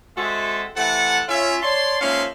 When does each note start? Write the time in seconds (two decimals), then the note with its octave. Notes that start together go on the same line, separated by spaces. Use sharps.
0.17 G#3 C4 F#4 A4 E5
0.76 C3 E3 A3 A4 F#5
1.29 C#4 F4 E5
1.62 C#5 D5 A5 C6
2.01 G#2 F3 A#3 C#4 E5 F5